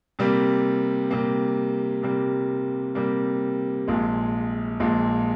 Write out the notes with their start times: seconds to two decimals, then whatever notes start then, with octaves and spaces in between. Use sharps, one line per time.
0.19 C3 G3 A#3
1.11 C3 G3 A#3
2.03 C3 G3 A#3
2.95 C3 G3 A#3
3.88 A#1 A#2 G#3
4.80 A#1 A#2 G#3